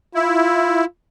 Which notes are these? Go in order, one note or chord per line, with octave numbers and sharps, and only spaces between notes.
E4 F4